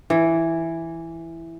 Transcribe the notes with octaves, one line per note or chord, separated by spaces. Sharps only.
E3